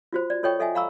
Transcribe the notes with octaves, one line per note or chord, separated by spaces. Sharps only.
F4 F#4 C5
D5
F4 A4 C#5 D#5 G5 C#6
A4 D#5 E5 F#5 G#5
F5 A#5 B5 C#6 E6